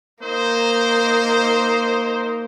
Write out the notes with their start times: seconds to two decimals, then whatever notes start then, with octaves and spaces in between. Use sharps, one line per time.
0.23 A#3 D#4 C5